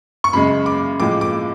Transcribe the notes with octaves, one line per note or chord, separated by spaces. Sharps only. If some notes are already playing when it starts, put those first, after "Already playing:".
C#6
F#2 C#3 G#3 B5
D6
A2 F3 G#3 D6
D6